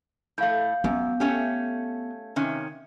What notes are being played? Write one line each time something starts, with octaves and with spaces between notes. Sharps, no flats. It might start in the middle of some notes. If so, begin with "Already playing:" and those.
A2 A3 F5 G6
F#2 B3
A3 C#4 G4
C3 D#3 C#4